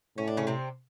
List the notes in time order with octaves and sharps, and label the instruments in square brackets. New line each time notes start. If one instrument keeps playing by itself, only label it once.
[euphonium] A2 [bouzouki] C#4
[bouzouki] D4
C#3 C#4
C3 C4